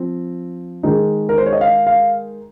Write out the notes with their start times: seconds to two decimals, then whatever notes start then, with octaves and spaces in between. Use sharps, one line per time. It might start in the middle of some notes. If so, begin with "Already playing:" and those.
Already playing: F3 C4
0.83 D#3 G#3 D#4
1.29 A#4
1.38 C5
1.46 C#5
1.53 D#5
1.61 F5
1.87 F5